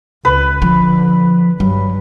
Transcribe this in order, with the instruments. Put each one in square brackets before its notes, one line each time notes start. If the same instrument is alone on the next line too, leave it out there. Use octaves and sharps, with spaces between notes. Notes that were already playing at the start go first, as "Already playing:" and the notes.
[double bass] C#2 [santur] B4
[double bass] D3 [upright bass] F3
[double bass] G2 [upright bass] F#3